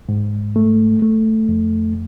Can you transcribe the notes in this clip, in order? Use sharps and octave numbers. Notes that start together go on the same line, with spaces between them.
G#2
A3
A3
F2